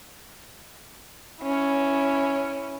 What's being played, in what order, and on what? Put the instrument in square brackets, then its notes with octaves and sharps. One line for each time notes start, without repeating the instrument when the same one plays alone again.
[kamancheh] C#4 E4